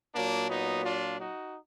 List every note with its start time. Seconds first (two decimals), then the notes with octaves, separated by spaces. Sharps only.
0.14 A#2 F#3 A#3 D4
0.49 B3 D#4
0.84 D4 F4
1.19 D#4 F#4